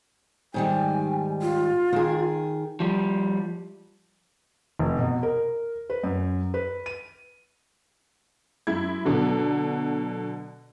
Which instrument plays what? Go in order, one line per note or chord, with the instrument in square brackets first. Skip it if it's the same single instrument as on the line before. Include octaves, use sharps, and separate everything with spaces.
[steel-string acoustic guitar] G#2 D#3 G3 [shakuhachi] G#5
[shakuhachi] F4
[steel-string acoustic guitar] D#3 G#4
[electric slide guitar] F3 G3
[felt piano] F1
B2
A#4
B4
F#2
B4
D#7
[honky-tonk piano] F#2 E4 G#6
B2 D3 F#3